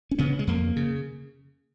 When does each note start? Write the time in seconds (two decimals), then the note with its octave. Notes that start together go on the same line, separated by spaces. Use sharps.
0.11 C#4
0.19 C#3 B3
0.39 G#3
0.47 F2 A#3
0.76 C#3